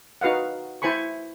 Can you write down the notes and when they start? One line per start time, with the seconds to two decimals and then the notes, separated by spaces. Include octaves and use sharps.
0.21 D#4 F#4 B4 F5 F#5
0.82 E4 C5 G#5 B5 C#6